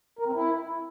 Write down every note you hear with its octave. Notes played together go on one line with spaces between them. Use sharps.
A#4
C4
E4